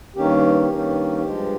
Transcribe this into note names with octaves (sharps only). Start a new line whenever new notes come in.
G2 D#3 A#3 C#4 G4
G2 D#3 A#3 C#4
G2 F3 G#3